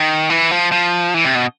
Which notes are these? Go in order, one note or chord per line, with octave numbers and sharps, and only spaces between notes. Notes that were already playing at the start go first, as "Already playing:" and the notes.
Already playing: D#3
E3
F3
F3
E3
C3
B2